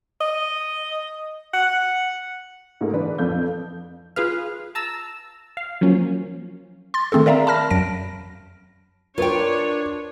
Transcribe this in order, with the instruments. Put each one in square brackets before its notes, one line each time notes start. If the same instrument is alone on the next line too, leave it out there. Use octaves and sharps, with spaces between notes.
[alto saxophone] D#5
F#5
[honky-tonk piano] G#2 A3 A#3
E3 D4 B4
F2 F3 A4 F5 G6
[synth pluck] F4 G#4 B4 F5
A5 A#5 E6
F5
F3 F#3 A#3 C#4
C6 A6
D#3 A3 C4 G#4 A4
A#4 D5 E5 F5 A#5
A5 B5 F6 A#6
F#2 F#3 A#6 D7
[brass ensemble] D4 [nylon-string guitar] F4 G5 [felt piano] A#4 B4 [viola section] C#5